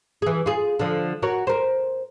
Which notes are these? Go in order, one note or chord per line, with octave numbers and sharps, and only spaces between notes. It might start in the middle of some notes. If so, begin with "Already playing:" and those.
E3 G#4
F4 G#4
D3 F3
F#4 A#4 C#5
A#4 C5